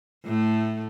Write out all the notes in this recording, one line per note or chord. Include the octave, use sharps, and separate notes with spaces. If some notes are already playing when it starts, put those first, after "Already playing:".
A2 A3